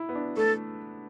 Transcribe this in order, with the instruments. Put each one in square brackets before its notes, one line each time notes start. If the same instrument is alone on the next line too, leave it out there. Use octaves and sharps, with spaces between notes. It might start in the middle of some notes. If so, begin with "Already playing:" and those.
Already playing: [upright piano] E4
B3
D4
[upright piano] A3 [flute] A4